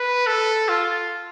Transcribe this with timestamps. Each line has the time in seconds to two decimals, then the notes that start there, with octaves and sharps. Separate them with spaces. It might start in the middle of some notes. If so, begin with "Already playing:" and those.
Already playing: B4
0.27 A4
0.69 F4